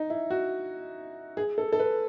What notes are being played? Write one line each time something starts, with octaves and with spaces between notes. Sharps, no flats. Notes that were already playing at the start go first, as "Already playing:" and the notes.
Already playing: D#4
E4
F#4
G#4
A4
A4
B4